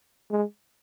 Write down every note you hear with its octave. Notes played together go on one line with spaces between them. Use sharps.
G#3